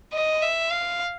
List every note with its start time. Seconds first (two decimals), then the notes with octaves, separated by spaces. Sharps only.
0.13 D#5
0.42 E5
0.72 F5